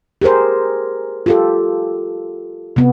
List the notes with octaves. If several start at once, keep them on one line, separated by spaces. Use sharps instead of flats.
G4 G#4 A#4 C5
F4 G4 A4
C3 B3